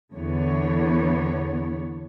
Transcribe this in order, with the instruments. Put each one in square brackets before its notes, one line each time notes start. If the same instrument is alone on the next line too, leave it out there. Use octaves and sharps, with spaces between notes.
[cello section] E2 D3 B3 C#5